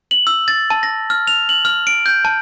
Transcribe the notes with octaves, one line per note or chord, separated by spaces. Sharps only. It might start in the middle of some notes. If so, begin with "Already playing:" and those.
F#7
E6
A6
A5
A#6
F6
F7
F#7
F6
D7
G6
A5